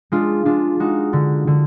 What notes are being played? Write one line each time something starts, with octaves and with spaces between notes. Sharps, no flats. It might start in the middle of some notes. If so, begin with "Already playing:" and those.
G#3 D4 F4
G#3 D4 F4
G#3 D#4 F#4
D3
D3